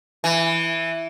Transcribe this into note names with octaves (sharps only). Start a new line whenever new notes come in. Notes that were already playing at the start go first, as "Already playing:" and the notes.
E3